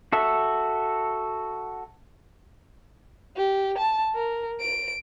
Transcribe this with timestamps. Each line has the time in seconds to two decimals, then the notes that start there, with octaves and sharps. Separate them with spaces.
0.13 F#4 A4 E5
3.37 G4
3.78 A5
4.15 A#4
4.60 D7